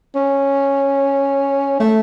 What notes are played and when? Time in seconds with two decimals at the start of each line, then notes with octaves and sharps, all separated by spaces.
0.16 C#4
1.80 A3